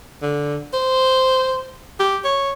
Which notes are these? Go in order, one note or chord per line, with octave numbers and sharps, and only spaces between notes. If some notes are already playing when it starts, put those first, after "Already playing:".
D3
C5
G4
C#5